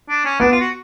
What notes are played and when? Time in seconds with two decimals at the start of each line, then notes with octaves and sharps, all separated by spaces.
0.09 D4
0.25 C#4
0.40 B3 D4
0.52 F4
0.60 F#4